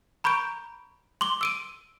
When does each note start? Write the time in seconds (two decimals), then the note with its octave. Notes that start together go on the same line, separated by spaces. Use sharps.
0.24 A#5 B5 C#6 G6 D7
1.21 C6 D6 G7
1.41 E6 D7 D#7